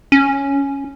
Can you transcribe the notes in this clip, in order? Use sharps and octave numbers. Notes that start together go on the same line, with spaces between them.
C#4